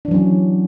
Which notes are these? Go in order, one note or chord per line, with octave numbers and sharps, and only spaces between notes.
E3 F#3 C#4 D4